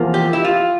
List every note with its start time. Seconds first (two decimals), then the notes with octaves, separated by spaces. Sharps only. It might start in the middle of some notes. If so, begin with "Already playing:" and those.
Already playing: E2 C3 F3 A#3
0.14 G4
0.33 E4
0.44 F4